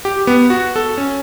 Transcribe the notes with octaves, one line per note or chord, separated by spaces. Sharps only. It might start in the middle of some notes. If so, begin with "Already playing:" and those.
G4
B3
F#4
A4
C#4